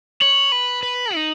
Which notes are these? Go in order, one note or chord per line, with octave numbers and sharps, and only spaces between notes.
C#5 F#7
B4
B4
D#4